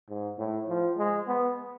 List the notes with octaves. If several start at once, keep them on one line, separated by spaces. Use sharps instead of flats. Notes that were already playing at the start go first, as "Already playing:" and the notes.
G#2
A2
F3
G#3
B3